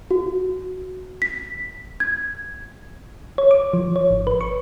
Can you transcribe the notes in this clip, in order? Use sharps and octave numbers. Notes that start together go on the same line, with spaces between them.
F#4
B6
G#6
C#5
D6
F3
C#5
G#1
B4
C#6